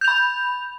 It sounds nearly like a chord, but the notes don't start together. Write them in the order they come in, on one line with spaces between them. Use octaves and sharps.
G6 F7 B5